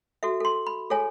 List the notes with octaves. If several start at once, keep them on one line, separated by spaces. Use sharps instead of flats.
F#4 A4 E5
A4 C6
B5
G#4 A4 C#5 G#5